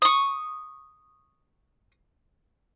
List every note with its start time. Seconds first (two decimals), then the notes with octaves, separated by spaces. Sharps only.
0.02 C#6 D#6